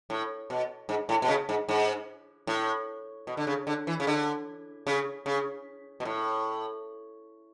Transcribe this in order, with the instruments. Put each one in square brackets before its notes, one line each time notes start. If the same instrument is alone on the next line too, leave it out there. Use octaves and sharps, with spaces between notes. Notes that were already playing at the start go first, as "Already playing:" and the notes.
[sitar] A2
B2
G#2
A2
B2
C#3
G#2
G#2
A2
B2
D3
C#3
D3
E3
C#3
D3
C#3
C#3
B2
A2